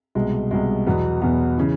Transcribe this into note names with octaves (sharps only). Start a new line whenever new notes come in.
C2 B2 G#3
C2 B2 G#3
E2 B2 F#3 B3
E2 B2 F#3 B3
C#3 E3